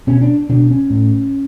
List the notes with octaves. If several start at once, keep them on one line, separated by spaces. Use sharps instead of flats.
B2 C#4
D4
B2 D4
C#4
A2